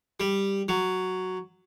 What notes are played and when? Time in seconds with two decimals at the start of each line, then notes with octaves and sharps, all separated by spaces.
0.20 G3
0.68 F#3